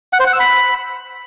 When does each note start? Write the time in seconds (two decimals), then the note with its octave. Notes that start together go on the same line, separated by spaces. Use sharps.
0.13 F#5
0.20 C5
0.26 F#5
0.33 E6
0.40 B5